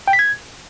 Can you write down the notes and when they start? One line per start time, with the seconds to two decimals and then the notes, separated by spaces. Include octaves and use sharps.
0.08 G5
0.13 B6
0.19 G#6